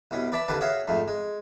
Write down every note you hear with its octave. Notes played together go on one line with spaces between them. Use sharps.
C2 B2 C#4
B4 D5 E5 A5 B5
D#2 D3 C#4 B4 A5
F#4 G#4 C#5 E5 F5
F2 G#2 A3
G#3